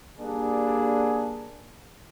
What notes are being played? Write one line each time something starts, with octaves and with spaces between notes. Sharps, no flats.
G3 A#3 D4 G#4